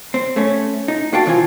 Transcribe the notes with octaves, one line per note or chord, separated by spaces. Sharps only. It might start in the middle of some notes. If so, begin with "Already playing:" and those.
C4
A3 C#4
D#4
A#3 F#4 F5 G5 A5
C2 D#3 E3 C4 F4 G#5